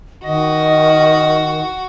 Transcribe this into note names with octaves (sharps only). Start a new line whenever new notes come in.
D#3 F#4 D#5